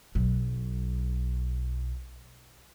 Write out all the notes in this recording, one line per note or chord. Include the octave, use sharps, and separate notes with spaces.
B1 F#3